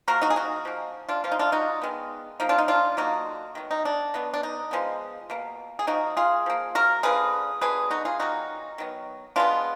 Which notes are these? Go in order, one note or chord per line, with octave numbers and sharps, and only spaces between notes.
F3 A#3 F#4 A#4
D#4 F#4
G#4
D#4 F#4
F3 A#3
D4 F4
F3 A#3 F4
D#4
D4 F4
D#4 F#4
D#3 G#3 B3
F3 A#3 D#4
D4 F4
D#4
D4 F4
D3 F#3 A#3 D#4 F#4
D#3 F#3 B3
D#4
D4
B2 F#3 B3
D4
D#4
F3 G#3 B3
B2 A#3
G#4
F3 A#3 D#4 F#4
F4 G#4
F3 A#3
F#4 A#4
D3 F3 A#3 G#4 B4
D3 F#3 B3 G#4 B4
D#4 F#4
F4 G#4
D#3 F#3 A#3 D#4 F#4
D#3 F#3 B3
B2 G#3 B3 D4 F4